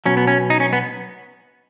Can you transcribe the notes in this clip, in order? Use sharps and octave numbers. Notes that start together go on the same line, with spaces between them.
B2 F#3 C#4
B3
C#4
D#4
C#4
B3